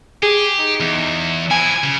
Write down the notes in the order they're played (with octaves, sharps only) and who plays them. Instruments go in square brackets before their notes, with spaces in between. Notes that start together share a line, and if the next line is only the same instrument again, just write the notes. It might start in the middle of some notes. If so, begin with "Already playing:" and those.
[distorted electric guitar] G4 [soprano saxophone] G#4
[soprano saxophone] D#4
[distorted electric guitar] E2
[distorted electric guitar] F3 E4 [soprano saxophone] G#5
[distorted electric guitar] C#3